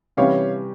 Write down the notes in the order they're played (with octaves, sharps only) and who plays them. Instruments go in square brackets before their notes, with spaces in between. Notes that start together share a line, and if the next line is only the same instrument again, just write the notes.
[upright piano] C3 E3 G3 C#4 G4 [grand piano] C#5 F5